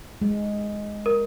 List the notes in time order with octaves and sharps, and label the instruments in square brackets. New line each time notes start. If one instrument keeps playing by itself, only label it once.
[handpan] G#3
[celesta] A#4